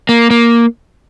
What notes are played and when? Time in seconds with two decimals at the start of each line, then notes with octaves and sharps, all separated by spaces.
0.09 A#3
0.31 A#3